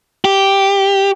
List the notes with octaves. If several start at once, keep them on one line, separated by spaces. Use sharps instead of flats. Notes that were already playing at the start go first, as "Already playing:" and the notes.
G4